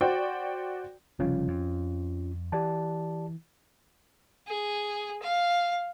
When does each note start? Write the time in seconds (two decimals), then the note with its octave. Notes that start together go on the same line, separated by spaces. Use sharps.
0.01 F#4 C5 D5 G5
1.19 F1 C#3 F3 G3 C#4 F4
1.48 F2
2.52 E3 G4 D5 A5
4.47 G#4
5.22 F5